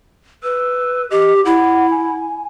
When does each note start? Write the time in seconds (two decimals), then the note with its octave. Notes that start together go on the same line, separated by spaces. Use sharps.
0.43 B4 E6
1.11 G4 D#5
1.45 E4 F#5
1.91 G#5